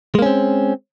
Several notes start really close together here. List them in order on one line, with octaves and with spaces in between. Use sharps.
G#3 A#3 C#4 C4